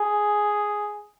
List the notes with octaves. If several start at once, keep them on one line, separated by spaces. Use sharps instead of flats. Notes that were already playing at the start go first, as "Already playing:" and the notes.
Already playing: G#4